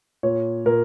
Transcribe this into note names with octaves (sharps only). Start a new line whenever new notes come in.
A#2 C#5
A#2 A#4